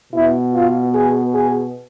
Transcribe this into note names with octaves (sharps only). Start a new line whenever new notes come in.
B2 B3 E4
F4
G#4
G#4